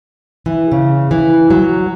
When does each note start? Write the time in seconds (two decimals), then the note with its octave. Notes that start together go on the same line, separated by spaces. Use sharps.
0.46 E3
0.72 C#3
1.11 E3
1.50 F#3